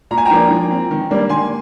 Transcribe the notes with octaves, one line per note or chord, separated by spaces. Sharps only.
A#2 A#5
G#5
G5 A#5
F3 A#3 D4
F3
C4
D#3
G3 A#3 D4
D#3 G#5 C6